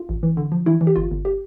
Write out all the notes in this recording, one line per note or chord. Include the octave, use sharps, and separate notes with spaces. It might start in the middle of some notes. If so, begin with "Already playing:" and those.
Already playing: F4
A1
E3
D3
F3
E3 E4
E3
G4
G1 F4
G1
G4